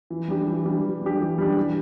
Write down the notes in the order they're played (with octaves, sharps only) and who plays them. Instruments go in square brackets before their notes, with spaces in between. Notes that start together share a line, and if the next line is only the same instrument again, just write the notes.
[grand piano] E3
G3 D4 G4
E3
G3 D4 G4
E3
G3 D4 G4
E3
G3 D4 G4
E3